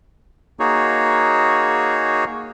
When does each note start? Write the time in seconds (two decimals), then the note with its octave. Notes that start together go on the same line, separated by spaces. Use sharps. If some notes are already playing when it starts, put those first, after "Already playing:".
0.59 A#3 D#4 F#4 G#4 C#5